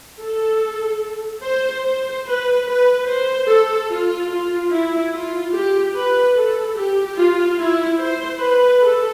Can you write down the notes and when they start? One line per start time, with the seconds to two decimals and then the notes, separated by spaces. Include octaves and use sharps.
0.21 A4
1.44 C5
1.85 C5
2.26 B4
2.66 B4
3.08 C5
3.48 A4
3.89 F4
4.31 F4
4.72 E4
5.13 F4
5.53 G4
5.95 B4
6.36 A4
6.77 G4
7.17 F4
7.58 E4
8.00 C5
8.40 B4
8.82 A4